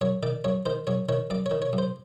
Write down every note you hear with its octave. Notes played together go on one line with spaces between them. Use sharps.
F#2 C#5
D#3 D5
F#2 C#5
D#3 C5
F#2 C#5
D#3 C#5
F#2 D5
C#5
D#3
C#5
F#2
C5